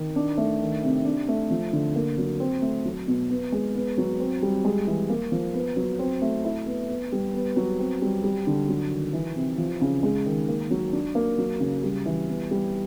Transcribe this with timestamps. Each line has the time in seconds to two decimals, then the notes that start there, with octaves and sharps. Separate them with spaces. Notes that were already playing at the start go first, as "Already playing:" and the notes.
Already playing: D#3
0.16 D4
0.37 A3
0.61 D#3
0.83 C3
1.05 D4
1.28 A3
1.50 F3
1.73 D3
1.95 A#3
2.18 F#3
2.40 C4
2.62 A3
2.85 F#3
3.08 B2
3.30 B3
3.52 G#3
3.75 B3
3.97 F#3
4.20 C4
4.42 G3
4.65 G#3
4.87 E3
5.10 A#3
5.32 F3
5.54 B3
5.76 F#3
5.99 C4
6.22 A3
6.45 E4
6.66 B3
6.89 B3
7.12 G3
7.34 B3
7.56 F#3
7.79 C4
8.02 G3
8.23 G3
8.47 D3
8.69 F#3
8.91 D#3
9.13 E3
9.36 C3
9.58 F3
9.81 C#3
10.03 G#3
10.26 D#3
10.48 A#3
10.71 F#3
10.93 D4
11.15 A#3
11.38 F#3
11.60 C#3
11.83 G3
12.06 E3
12.28 B3
12.51 G3